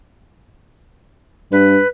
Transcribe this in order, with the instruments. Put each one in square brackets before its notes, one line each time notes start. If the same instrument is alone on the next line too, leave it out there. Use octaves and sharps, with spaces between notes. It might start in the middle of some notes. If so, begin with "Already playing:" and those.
[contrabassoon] G2 [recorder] B4